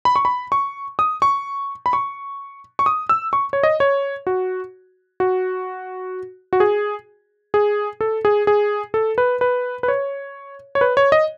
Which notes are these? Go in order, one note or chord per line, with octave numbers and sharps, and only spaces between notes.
B5
C#6
B5
C#6
D#6
C#6
B5
C#6
C#6
D#6
E6
C#6
C#5
D#5
C#5
F#4
F#4
F#4
G#4
G#4
A4
G#4
G#4
A4
B4
B4
B4
C#5
C#5
B4
C#5
D#5